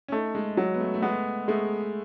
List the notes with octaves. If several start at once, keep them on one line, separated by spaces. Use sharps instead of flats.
C#4
A3 D#4
G#3
F#3
B3
A3
A3
G#3 B3
G#3 A3